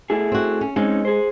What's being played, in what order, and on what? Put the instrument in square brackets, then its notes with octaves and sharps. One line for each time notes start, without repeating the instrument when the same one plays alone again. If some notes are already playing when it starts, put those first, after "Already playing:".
[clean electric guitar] A3 E4 G#4
[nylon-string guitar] C4 F#4
C#4
[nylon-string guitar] G#3 [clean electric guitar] C4 C#4 D#4
[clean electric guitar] G#4 C5